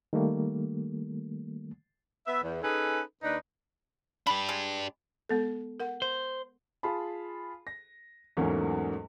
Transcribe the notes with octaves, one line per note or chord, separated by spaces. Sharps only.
D#3 G3 A3 A#3
B3 B4 E5
E2
C#4 D#4 G#4 A4 B4
D#2 D4 D#4 B4
D4 G4 B5
G#3
G#3 B3 A4
A#4 F#5
C5
F4 G#4 A5 B5
A#6
E2 G#2 F#3 A3 A#3 C#4